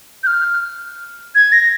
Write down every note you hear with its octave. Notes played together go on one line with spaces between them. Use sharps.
G6
F6
G#6
A#6